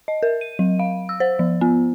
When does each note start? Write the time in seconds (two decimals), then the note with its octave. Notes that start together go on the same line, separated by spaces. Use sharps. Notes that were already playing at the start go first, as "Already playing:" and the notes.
0.08 D#5
0.23 A#4
0.41 D#7
0.59 F#3
0.79 F5
1.09 E6
1.20 C5
1.39 F3
1.61 B3